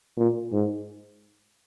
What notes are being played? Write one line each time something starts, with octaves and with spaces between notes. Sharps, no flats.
A#2
G#2